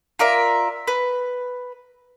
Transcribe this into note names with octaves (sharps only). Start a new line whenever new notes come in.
F4 A#4 D5 E5
B4